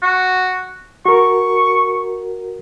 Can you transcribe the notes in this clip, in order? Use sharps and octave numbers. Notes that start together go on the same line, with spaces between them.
F#4
F#4 A#4 C#6